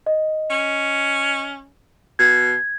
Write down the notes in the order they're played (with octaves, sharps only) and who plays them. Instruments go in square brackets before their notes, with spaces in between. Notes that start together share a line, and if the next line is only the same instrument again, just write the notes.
[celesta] D#5
[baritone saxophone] C#4
[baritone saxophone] B2 [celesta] G#6